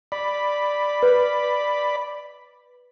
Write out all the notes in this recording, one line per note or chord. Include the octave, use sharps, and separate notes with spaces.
D5 B5
B4